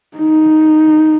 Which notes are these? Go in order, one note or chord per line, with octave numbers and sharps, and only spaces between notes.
D#4